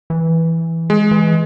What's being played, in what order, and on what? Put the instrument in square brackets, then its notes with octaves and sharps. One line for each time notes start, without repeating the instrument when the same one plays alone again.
[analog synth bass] E3
[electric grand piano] G#3
[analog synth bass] E3